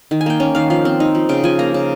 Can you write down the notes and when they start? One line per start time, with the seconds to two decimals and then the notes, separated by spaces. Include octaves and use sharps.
0.11 D#3
0.21 G#5
0.26 A#3 G5
0.40 C#4
0.55 D#3 F5
0.70 F3 F5
0.85 C4
1.00 D#4
1.15 F3
1.29 C#3 G5
1.44 F3 G#5
1.59 A#3 A#5
1.74 C#3